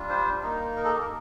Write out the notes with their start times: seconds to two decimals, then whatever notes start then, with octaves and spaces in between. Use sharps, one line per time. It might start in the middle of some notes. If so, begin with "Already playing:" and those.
Already playing: G3 D4 F4
0.09 C5
0.43 A#3 D#4
0.77 A#4
0.85 A4
0.93 G4
1.01 A#4